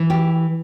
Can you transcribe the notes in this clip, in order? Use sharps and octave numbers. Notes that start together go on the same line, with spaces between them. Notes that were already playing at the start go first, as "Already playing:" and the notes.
Already playing: E3
G4